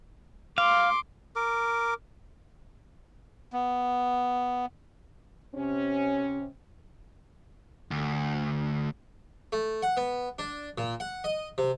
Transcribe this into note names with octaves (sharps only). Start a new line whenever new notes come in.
F5 C6 D6
A#4 D6
B3
C3 C#4
D2
A3
F#5
B3
D4
A#2
F#5
D#5
C3